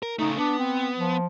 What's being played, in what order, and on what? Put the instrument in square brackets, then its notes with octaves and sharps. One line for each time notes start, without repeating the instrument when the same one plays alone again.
[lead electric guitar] A#4
[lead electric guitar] C#3 A3 [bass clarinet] D#4
[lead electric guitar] B3 [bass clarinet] D4
[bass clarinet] C4
F3